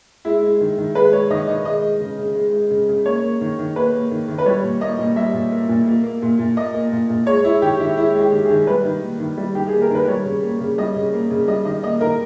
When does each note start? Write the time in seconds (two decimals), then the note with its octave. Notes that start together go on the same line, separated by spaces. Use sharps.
0.25 G#3 E4
0.42 G#3
0.60 D#3
0.78 D#3
0.95 G#3 B4
1.13 G#3 C#5
1.30 D#3 D#5
1.48 D#3 D#5
1.65 G#3 D#5
1.83 G#3
2.00 C#3
2.18 C#3
2.35 G#3
2.52 G#3
2.70 C#3
2.89 C#3
3.06 A#3 C#5
3.23 A#3
3.41 D#3
3.59 D#3
3.76 A#3 B4
3.93 A#3
4.11 D#3
4.28 D#3
4.38 B4
4.46 G3 C#5
4.63 A#2
4.81 A#3 D#5
4.99 A#2
5.16 G3 E5
5.33 A#2
5.52 A#3
5.69 A#2
5.86 A#3
6.03 A#3
6.22 A#2
6.39 A#2
6.57 A#3 D#5
6.74 A#3
6.92 A#2
7.10 A#2
7.26 G#3 C#5
7.44 G#3 E4
7.62 D#3 G4
7.79 D#3 E4
7.96 G#3 E4
8.15 G#3
8.21 G4
8.32 D#3
8.44 G#4
8.50 D#3
8.67 G3 B4
8.85 D#3
9.02 A#3
9.20 D#3
9.38 G3
9.55 D#3 G4
9.68 A#3 G#4
9.82 A#4
9.90 D#3 B4
10.08 G3 C#5
10.25 C#3
10.43 A#3
10.60 C#3
10.78 G3 D#5
10.95 C#3
11.13 A#3
11.30 C#3
11.48 G3 D#5
11.65 D#3 D#5
11.83 A#3 D#5
12.01 D#3 A#4